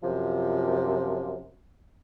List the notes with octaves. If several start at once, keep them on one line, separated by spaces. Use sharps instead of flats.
F#2 C3 F3